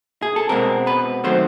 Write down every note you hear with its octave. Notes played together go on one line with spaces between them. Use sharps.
G#4
A4
B2 G#3 C4 A#4
B4
D#3 F#3 A3 C4 C5